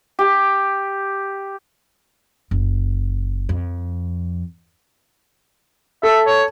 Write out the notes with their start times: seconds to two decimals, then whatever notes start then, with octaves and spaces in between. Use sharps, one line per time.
0.19 G4
2.51 F#1
3.49 F2
6.03 A4 E5
6.27 C#5